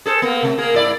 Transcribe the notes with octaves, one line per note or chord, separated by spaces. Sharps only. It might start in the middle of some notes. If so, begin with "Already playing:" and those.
G#4 A4 C5
A#3 B3
C3 A3
A#3 G#4 A#4
G#2 E4 D5